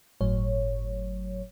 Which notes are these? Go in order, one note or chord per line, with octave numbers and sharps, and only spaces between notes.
G1 A2 F#3 C#5